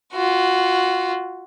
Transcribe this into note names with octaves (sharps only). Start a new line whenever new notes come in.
F4 F#4